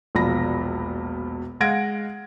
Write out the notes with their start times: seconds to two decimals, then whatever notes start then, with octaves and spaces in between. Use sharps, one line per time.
0.15 E1 A#1 B2 F3 B5 A#6
1.60 G#3 F5 F#5 G#6 A#6 D7